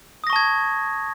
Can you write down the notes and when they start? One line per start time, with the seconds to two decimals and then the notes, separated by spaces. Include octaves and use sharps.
0.24 D#6
0.27 A#6
0.30 C#6
0.33 A5
0.36 G#6